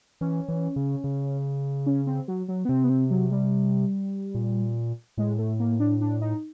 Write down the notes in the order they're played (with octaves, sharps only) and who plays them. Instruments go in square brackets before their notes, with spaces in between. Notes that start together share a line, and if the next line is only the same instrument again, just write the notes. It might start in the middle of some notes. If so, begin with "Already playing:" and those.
[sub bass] E3 [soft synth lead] C#4
[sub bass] E3
C#3
C#3
[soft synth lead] C#4
C4
F#3
F#3
B3
[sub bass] C3 [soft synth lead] C4
[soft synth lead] B3
C4
F#3
G3
[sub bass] A#2
[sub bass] A2 [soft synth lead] G#3
[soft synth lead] A3
A#3
D4
D4
D#4